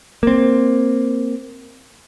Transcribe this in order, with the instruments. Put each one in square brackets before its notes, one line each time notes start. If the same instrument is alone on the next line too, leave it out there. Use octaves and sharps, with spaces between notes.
[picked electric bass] A#3 C4